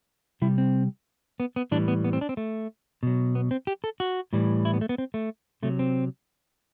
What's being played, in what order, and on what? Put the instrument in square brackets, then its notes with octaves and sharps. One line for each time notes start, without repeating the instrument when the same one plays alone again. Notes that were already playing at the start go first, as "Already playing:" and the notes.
[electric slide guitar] C3 G3 E4
C4
B3
B3
A2 E3 G3 D4
B3
B3
C4
D4
C4
A3
B2 F#3
B3
C4
G4
A4
F#4
A2 E3 G3
E4
B3
A3
B3
C4
A3
C3 F#3 A3
C4